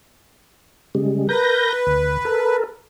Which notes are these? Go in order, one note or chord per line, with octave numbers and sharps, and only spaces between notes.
C#3 G3 G#3
A#4 B4 G6 A#6
D2
A4 A#4